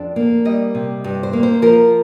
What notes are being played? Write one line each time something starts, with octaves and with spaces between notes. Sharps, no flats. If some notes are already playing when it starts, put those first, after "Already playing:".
Already playing: F2 D4
A#3
G3 D#5
C3
G2
C5
A#3
C5
F3 A#4